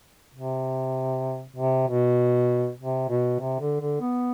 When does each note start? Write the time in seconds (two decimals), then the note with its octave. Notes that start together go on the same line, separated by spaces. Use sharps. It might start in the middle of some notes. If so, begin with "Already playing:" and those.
0.35 C3
1.56 C3
1.88 B2
2.79 C3
3.09 B2
3.40 C3
3.60 D3
3.80 D3
4.01 B3